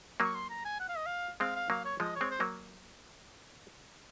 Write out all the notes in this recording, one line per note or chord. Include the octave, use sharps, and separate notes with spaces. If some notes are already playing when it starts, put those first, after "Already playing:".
F#3 A#3 C#6
C6
A#5
G#5
F#5
F5
D#5
F5
G#3 C4 F5
F5
F#3 A#3 F5
C#5
F3 G#3 D#5
C#5
G#3 C4
C5
F#3 A#3